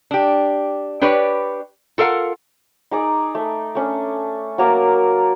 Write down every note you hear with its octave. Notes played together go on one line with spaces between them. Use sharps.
D4 G4
D4 G4 B4 C#5 D5
F4 A4 A#4 F5 F#5
D#4 G#4 D5
A3
A3 C#4 D4
F#3 A#3 A#4 D5